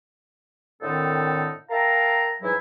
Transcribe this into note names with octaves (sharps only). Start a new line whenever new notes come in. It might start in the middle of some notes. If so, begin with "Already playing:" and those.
A2 D3 D#3 C4 D#4 A4
A#4 E5 F5 G5 A5 A#5
G#2 E3 F#3 D#4 E4